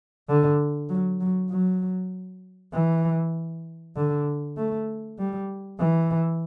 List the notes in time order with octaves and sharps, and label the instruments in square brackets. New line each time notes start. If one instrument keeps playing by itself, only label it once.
[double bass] D3
F#3
F#3
F#3
E3
D3
A3
G3
E3